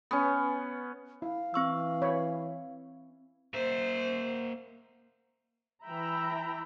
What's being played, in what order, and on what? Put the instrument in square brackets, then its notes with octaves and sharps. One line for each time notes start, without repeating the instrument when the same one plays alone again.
[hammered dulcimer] B3 C#4
[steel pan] E4 [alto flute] F5
[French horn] E3 [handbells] C4 C#6 E6
[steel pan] B4 C#5 B5
[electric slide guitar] A#3 E5 [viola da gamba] C5
[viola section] E3 E4 E5 G5 A#5 B5